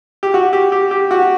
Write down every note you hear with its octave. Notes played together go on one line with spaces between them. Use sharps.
G4
F#4
G4
G4
G4
F#4